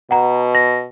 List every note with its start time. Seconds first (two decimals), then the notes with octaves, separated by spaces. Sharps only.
0.11 B2 F#5 A#5
0.55 A#6